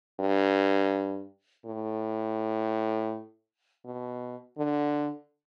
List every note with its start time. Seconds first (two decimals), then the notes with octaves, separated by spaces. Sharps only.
0.20 G2
1.66 A2
3.85 B2
4.58 D3